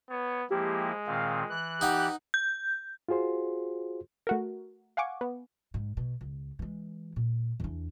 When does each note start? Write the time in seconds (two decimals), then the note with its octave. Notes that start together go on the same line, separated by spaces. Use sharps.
0.10 B3 C#5
0.50 F3 G#3 A#3 E4 G4
1.07 A#2 D#3 C4 F5
1.49 E3 F#6
1.81 D#4 G4 F#5
2.34 G6
3.09 F4 F#4 G#4 C5 C6
4.27 A3 F#4 A#4
4.97 F5 F#5 G#5 C#6 D6
5.21 B3
5.74 G#2
5.97 B2
6.21 C#2
6.59 E3 G#3
7.16 A#2
7.60 E2 D4